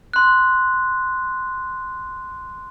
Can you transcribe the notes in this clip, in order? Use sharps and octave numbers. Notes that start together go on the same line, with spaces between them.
C6 F#6